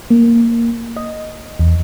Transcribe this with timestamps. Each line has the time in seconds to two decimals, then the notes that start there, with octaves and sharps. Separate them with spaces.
0.10 A#3
0.97 D#5
1.59 E2